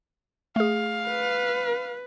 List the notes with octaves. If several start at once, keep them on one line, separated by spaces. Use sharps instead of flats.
A3 G#4 F5
B4